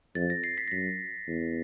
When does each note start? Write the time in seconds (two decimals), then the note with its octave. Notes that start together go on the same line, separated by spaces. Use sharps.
0.15 F2 A6
0.30 A#6
0.44 C7
0.58 B6
0.68 A#6
0.71 F#2 B6
1.27 E2